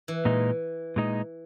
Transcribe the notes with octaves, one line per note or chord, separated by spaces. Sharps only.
E3
A#2 G#3 D#4
A#2 G#3 D#4